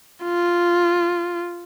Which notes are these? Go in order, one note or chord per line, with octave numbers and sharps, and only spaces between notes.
F4